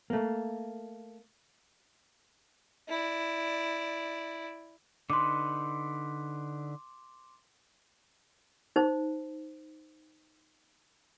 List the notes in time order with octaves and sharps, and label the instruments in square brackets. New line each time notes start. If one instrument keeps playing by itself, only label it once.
[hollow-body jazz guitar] A3 A#3
[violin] E4 D5
[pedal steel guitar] D3 D#4 B4 [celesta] C6 D6
[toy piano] D#4 C5